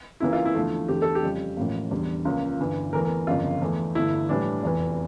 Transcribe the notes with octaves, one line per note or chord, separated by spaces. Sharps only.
C#2 C#3 E3 A#3 E4
F4
E4
E2 D3 F3 A3
E2 D3 A3 G4
A4
G4
F2 C#3 G3
A1 A2 F3 A#3
E1 E2 D3 G3
C#2 C#3 F3 A#3
G1 G2 E3
E2 E3 A3 A#4
A#4
G1 F2 C#3 F3 A#3 F4
E2 E3 A3
G1 G2 D3 A3 E4
A#1 A2 E3 G3 D4
F1 E2 E3